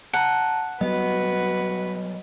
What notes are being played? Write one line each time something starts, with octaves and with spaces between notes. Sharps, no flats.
F#5 A5 A#5
F#3 G3 B3 F#4 B4 D#5